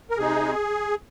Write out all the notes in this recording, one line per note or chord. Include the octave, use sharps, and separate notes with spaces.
A#4
C3 G#3 D#4 G#4